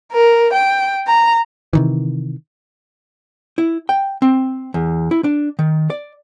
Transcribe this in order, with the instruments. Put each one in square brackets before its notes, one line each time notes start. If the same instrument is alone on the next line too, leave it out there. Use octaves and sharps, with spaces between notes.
[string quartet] A#4
G5
A#5
[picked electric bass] C3 D#3 E3
[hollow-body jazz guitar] E4
G5
C4
E2
E4
D4
D#3
D5